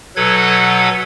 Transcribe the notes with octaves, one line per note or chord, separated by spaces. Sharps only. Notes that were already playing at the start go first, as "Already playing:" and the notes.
B2 F#3 A4 B4 F#5 G#6